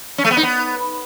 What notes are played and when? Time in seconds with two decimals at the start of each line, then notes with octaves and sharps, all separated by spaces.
0.18 C#4
0.24 A3
0.31 B3
0.37 D#4
0.43 B3